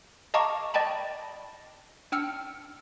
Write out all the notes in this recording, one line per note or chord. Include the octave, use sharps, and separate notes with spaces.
D#5 F5 A5 A#5 C#6 D6
D5 D#5 G5 A5 B5
D4 G5 E6 F6 C#7